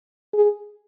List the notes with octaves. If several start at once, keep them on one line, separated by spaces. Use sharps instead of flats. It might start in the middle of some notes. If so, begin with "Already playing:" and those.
G#4